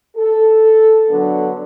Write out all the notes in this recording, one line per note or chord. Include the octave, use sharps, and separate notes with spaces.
A4
D3 F#3 B3 D4